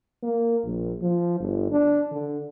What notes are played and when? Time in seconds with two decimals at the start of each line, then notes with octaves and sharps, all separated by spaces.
0.23 A#3
0.64 A#1
1.01 F3
1.40 G1
1.71 D4
2.11 D3